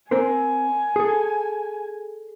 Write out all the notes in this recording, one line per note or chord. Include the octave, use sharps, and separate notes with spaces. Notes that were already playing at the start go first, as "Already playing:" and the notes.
C4 A#4 C5 G#5
G#4 A4